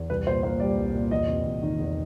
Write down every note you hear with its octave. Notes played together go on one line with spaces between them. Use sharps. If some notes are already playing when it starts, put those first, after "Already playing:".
Already playing: E2
C2 B4
A#2 C5
A#3 C5
G3 D5
C2
A#2
E2 D#5
C3
E2
D#3
E2